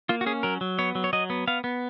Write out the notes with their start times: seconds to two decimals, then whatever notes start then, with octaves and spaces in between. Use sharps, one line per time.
0.09 A#3 F4
0.21 F#4
0.26 C#4 G#4
0.43 F#3 A#4
0.61 F#3
0.78 B3 C#5
0.95 F#3
1.04 C#5
1.13 F#3 D#5
1.30 B3
1.47 B3 F5
1.64 B3